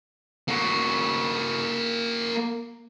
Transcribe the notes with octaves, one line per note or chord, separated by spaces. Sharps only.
A#3 F#4